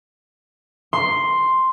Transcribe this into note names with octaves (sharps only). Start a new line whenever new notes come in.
C6